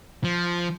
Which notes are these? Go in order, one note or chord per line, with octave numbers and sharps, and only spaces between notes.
F3